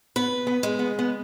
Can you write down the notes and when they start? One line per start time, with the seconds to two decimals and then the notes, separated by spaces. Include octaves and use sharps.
0.16 B3 B4
0.47 B3
0.63 G#3
0.79 B3
0.99 B3